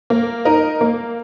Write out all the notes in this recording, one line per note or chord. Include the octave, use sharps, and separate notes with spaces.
A#3
D#4 A#4 D#5
A#3